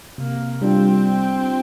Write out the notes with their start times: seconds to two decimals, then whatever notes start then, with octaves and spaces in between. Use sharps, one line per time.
0.18 C3 A#3
0.60 G3 C4 D4 F4